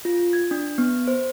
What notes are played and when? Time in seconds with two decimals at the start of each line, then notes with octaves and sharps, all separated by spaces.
0.05 F4
0.33 G#6
0.51 D4
0.78 B3
1.08 C5